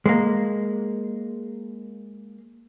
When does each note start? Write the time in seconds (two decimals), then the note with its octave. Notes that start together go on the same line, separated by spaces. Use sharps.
0.06 G#3 A#3